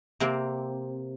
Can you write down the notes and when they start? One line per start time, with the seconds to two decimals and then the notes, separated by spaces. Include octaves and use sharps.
0.20 C3 A#3 C4